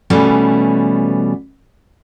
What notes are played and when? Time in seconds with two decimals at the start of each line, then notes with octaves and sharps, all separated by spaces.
0.10 B2 E3 G3 A3 C#4